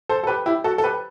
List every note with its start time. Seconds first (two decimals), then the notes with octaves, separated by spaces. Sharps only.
0.09 A4 C5
0.24 A4
0.27 G4 B4
0.46 E4 G4
0.64 F#4 A4
0.78 A4
0.84 G4 B4